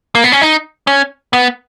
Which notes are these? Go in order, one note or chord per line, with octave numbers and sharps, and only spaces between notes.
A#3
B3
C#4
D#4
C#4
B3